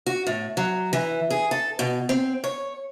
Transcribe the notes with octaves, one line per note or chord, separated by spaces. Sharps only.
F#4
A2
F#3
E3
G#4
A4
B2
C4
C#5